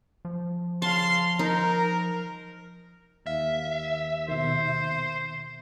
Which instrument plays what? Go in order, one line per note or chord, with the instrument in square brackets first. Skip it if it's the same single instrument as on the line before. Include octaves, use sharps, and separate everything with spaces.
[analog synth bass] F3
[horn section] C#3 F5 C6 [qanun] A5
[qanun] D#4 [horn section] A#4
[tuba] D#2 [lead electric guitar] E5 [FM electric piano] F5
[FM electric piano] B2 D#3 [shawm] C5